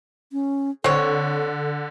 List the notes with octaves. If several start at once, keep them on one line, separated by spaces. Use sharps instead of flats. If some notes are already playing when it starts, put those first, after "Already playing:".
C#4
D3 C4 A4 C#5